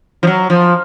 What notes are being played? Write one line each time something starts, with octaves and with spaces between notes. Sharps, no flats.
F3
F#3
F3